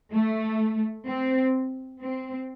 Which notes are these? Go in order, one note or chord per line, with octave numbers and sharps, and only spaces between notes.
A3
C4
C4